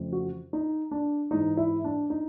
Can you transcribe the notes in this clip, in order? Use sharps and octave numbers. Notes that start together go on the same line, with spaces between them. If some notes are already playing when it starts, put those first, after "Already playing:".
Already playing: F2 C#3 F3 A3
F#4
D#4
D4
G#2 E3 G#3 D#4
E4
D4
D#4